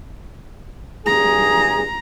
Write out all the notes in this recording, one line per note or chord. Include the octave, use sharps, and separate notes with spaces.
G2 G#4 A#5